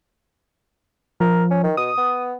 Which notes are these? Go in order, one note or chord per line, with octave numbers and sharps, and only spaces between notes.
F3 A#4
C#4
D#3
B2 D#6
B3